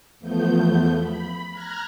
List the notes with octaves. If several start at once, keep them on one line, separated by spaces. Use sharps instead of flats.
E2 F3 A3 B3 G6
B5
A#5 F6 F#6 G#6 A#6